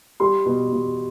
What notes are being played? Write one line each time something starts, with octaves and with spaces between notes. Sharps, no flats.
G3 C6
B2
B2